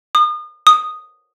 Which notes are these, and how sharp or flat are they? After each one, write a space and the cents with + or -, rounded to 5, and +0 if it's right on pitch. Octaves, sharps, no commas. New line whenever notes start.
D#6 -35
D#6 -5